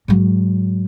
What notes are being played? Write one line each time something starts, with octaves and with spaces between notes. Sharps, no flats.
G#2 F#3